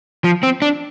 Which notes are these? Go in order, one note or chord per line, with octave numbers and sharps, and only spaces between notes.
F3
C4
D4